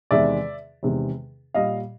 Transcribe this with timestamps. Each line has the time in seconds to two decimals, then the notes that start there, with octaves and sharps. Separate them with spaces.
0.11 E2 C3 D#3 G#3 D5 E5
0.83 E2 C3 D#3 G#3
1.54 A#2 G3 D#5 F5